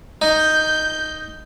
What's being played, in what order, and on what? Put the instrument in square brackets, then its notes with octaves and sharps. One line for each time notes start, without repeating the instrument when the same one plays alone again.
[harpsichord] D#4 [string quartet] G6